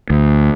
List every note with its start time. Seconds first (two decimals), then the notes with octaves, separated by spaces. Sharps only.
0.10 D2